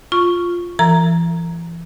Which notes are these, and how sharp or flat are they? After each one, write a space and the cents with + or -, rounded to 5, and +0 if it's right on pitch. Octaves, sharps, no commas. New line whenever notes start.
F4 +0 C#6 +0
E3 +35 A#4 -45 A#5 +0